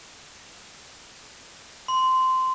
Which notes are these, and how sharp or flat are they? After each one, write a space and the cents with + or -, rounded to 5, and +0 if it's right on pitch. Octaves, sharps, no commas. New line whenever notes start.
C6 -15